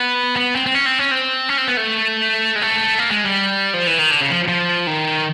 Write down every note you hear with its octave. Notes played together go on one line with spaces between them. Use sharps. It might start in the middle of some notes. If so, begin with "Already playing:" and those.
Already playing: B3
B3
C4
C4
C#4
C4
C#4
C4
C#4
C4
B3
A3
G#3
A3
A#3
G#3
G3
F3
E3
D#3
D3
C#3
F3
F3
D#3